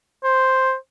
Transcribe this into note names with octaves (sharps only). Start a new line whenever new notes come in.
C5